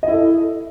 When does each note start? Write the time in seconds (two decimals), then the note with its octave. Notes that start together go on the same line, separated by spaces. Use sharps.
0.03 D#5
0.08 E4
0.13 A4